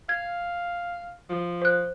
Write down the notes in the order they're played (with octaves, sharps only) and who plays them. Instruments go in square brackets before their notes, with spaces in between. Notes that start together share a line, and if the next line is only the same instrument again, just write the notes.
[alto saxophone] F5 [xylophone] G#6
[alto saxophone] F3
[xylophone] C5 F#6